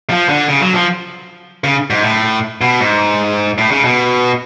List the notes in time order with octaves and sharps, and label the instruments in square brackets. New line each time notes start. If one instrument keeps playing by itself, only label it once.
[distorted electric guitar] F3
D3
C#3
F#3
F3
C#3
G#2
A2
B2
G#2
A2
C#3
B2